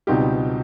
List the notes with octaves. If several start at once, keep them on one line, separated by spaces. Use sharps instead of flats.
C#2 B2 G3 C4 D#4 G4